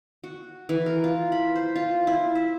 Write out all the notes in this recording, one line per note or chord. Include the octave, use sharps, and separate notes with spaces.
F#4
E3
A#4
F4
B5
C5
F4
E4
E5